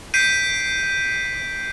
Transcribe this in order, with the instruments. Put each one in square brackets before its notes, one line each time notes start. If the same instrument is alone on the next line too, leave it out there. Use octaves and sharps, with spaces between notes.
[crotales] G6 B6 C7 D7 D#7